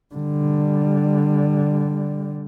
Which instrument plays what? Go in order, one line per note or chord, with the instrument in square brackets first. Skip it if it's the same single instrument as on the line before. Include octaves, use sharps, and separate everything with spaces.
[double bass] D3 G3